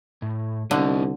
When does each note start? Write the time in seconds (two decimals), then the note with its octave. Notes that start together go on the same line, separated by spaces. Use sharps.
0.22 A2
0.71 C2 D3 C#4 D#4